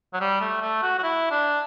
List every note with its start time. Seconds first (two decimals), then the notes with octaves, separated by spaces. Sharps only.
0.13 F#3
0.20 G3
0.41 A3
0.61 A3
0.82 F#4
0.98 F#4
1.03 E4
1.31 D4